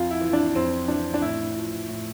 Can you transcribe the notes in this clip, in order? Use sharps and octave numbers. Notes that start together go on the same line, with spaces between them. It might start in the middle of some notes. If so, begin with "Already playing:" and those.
Already playing: F2 F4
E4
E3
D4
F2 C4
E3 D4
D4
A2 E4
F3
A2